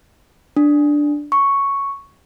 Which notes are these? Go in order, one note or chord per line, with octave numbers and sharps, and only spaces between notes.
D4
C#6